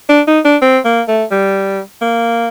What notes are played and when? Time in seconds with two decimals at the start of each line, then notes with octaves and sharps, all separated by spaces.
0.09 D4
0.27 D#4
0.45 D4
0.62 C4
0.85 A#3
1.08 A3
1.31 G3
2.01 A#3